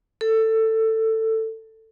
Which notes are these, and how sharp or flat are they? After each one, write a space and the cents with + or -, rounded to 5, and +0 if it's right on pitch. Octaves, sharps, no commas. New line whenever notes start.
A4 +15